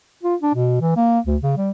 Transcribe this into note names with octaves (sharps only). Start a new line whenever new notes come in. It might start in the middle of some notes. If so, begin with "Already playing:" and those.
F4
D4
B2
E3
A#3
D2
C#3
G3